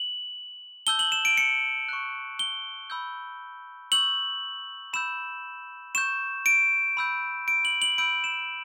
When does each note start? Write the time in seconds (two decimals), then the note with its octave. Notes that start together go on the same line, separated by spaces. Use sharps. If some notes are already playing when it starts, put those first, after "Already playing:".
Already playing: F#7
0.87 A5 E6 G6 G7
0.99 F#7
1.12 E7
1.25 D7
1.37 C#7
1.89 C#6 F#6
2.39 G7
2.90 B5 E6 G6
3.92 C#6 E6 G6 F#7
4.93 B5 E6 G6 E7
5.95 C#6 G6 E7
6.46 D7
6.97 B5 E6 G6
7.48 D7
7.65 F#7
7.82 F#7
7.98 B5 E6 G6 D7
8.24 E7